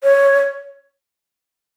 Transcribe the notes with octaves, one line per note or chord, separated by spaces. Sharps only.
C#5